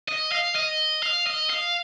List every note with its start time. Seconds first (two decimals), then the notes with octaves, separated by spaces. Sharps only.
0.08 D#5
0.31 F5
0.55 D#5
1.03 F5
1.27 D#5
1.50 F5